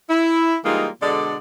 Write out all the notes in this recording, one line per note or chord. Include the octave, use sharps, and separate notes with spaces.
E4
E3 G3 G#3 A#3 D#4 F4
B2 D3 G#3 A4 D5